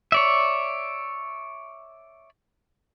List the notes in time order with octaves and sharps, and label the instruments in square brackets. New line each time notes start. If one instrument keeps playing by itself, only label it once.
[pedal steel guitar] C#5 D5 E5